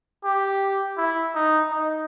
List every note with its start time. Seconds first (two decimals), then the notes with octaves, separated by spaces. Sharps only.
0.25 G4
0.98 E4
1.35 D#4
1.72 D#4